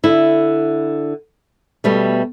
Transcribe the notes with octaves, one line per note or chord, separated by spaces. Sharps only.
D3 E4
B2 G3 A3